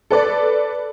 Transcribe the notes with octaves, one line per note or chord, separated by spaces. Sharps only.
A4 B4 D5